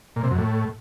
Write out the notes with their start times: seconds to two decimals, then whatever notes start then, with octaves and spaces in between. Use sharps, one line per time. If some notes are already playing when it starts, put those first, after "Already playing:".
0.16 A#2
0.23 C3
0.31 F#2
0.38 A2